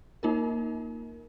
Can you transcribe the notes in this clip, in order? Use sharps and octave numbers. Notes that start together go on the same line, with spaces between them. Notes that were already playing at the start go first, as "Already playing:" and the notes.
A#3 D#4 F4 A#4